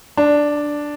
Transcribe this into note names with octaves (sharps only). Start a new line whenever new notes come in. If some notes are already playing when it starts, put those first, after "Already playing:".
D4